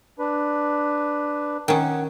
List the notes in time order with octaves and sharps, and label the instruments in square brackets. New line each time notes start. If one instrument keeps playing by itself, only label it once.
[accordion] D4 B4
[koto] D#3 C#4 [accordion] F#5